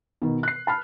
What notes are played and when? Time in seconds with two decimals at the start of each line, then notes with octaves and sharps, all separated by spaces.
0.22 B2 D#3
0.43 F#6 C7
0.67 A5 B5 F6